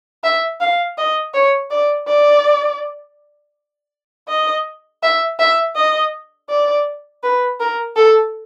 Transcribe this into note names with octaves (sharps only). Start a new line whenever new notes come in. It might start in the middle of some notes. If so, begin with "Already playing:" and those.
E5
F5
D#5
C#5
D5
D5
D#5
E5
E5
D#5
D5
B4
A#4
A4